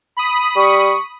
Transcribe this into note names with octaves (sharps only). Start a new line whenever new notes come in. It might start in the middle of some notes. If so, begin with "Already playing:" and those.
B5 D#6
G3 C#6